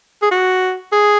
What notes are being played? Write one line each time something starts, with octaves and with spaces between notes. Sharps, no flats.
G#4
F#4
G#4